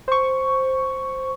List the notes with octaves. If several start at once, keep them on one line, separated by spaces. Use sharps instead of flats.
C5 C#6